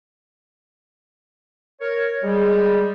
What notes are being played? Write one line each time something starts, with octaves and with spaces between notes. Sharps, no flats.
A#4 C#5
G3 G#3